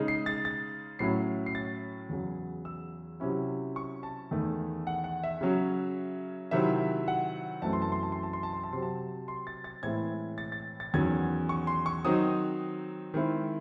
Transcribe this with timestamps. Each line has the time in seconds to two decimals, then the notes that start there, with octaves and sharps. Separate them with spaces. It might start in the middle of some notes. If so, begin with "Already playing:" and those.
Already playing: C#3 G#3 D#4
0.08 C7
0.26 A6
0.45 A6
0.99 A2 F#3 C#4 E4 C7
1.46 C7
1.55 A6
2.09 E2 C#3 F#3
2.65 E6
3.20 C3 F#3 C#4 E4
3.76 C#6
4.03 A5
4.31 E2 D#3 A3
4.87 F#5
5.04 F#5
5.24 E5
5.41 C#3 F#3 C#4
6.51 C3 D#3 F#3 C4 E4 E5
7.08 F#5
7.62 F#2 E3 A3 C4 A5
7.73 C6
7.82 A5
7.92 C6
8.03 A5
8.12 C6
8.23 A5
8.33 C6
8.43 A5
8.53 C6
8.64 A5
8.72 C3 F#3 C4 C6
8.82 A5
9.28 C6
9.47 A6
9.64 A6
9.83 A2 E3 G#3 C4 E4 G#6
10.38 A6
10.52 A6
10.80 A6
10.94 E2 D#3 F#3 C#4 G#6
11.49 C#6
11.67 C6
11.86 C#6
12.05 D#3 F#3 C4 D#4 D#6
13.14 D#3 G#3 C4 E4